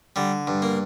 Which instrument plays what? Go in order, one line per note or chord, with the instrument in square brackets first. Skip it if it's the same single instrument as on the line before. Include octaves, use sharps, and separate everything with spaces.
[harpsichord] D3 G3
G2
A#3